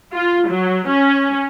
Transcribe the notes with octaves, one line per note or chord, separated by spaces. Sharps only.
F4
F#3
C#4